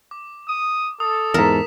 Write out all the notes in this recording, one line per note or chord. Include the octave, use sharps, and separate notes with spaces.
D6
D#6
A4 D#6
E2 G#2 A#4 B6 E7